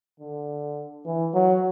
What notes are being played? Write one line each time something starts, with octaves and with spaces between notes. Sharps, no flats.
D3
E3
F#3